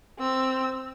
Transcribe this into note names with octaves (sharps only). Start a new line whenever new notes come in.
C4 E6